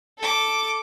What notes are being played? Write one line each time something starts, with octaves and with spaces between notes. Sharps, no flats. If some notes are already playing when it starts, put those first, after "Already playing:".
A4 D6